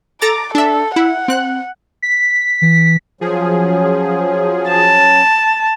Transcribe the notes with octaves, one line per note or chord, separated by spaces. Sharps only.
A4 A#5 D6 A6
D4 A4 E5
E4 F#5
C4 F#6
B6
E3
F3 F#3 C#4 G#4
A5